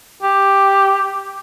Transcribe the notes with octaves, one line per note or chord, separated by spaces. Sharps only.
G4